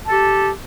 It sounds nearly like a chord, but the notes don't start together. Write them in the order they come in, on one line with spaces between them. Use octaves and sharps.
A5 A4 G4